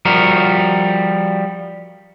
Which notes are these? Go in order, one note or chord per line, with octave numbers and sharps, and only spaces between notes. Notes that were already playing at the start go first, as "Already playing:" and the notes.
F3 G3 F#4 A#4